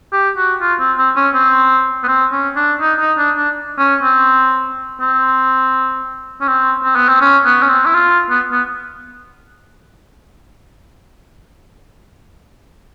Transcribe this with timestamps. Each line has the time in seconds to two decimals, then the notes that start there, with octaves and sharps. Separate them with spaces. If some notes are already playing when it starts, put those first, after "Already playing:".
0.12 G4
0.37 F#4
0.61 F4
0.80 C4
0.98 C4
1.16 C#4
1.34 C4
2.03 B3
2.08 C4
2.32 C#4
2.56 D4
2.81 D#4
3.00 D#4
3.18 D4
3.36 D4
3.79 C#4
4.03 C4
5.01 C4
6.41 C#4
6.48 C4
6.84 C4
6.96 B3
7.08 C4
7.21 C#4
7.45 B3
7.63 C#4
7.69 C4
7.86 E4
7.94 F4
8.30 B3
8.52 B3